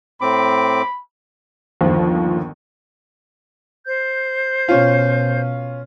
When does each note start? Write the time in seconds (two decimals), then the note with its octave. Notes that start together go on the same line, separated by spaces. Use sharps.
0.21 A2 C4 B5 D6
1.81 G1 D#2 F3
3.86 C5 G6
4.68 B2 C#4 F4